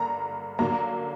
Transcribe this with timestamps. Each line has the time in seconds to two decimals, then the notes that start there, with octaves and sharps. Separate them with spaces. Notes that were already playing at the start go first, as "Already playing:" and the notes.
Already playing: G2 D3 A#3 A#5
0.59 D3 F#3 A#3 A#5